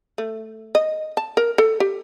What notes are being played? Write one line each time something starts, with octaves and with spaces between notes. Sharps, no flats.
A3
D#5
A5
A#4
A4
G4